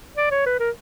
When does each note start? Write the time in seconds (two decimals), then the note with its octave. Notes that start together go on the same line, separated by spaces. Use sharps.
0.17 D5
0.31 C#5
0.46 B4
0.60 A#4